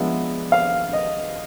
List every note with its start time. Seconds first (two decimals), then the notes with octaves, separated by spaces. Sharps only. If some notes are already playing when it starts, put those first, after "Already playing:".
Already playing: F3 G#3 B3 D4 E5
0.52 F5
0.93 D#5